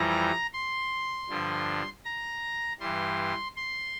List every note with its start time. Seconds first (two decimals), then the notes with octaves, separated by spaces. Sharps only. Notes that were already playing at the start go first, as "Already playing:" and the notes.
Already playing: F2 E3 G3 A#5
0.53 C6
1.30 G2 D3 F3
2.05 A#5
2.80 G2 E3 G3 C6
3.56 C6